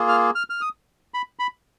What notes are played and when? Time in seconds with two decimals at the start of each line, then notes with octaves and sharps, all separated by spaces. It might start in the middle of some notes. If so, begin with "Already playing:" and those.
Already playing: A#3 F4 G#4
0.08 F6
0.35 F6
0.50 F6
0.61 D#6
1.14 B5
1.39 B5